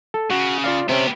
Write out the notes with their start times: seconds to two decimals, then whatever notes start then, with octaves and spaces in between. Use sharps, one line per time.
0.14 A4
0.31 C#3 F#4
0.64 F4 D5 F5
0.89 C3 B3 C#4 G4